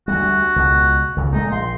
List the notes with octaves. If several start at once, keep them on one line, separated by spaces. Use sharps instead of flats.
D2 G3 F#4
C#2 B2
C#2 C#3
A#2 G#3 A3 D#4
A#1 C6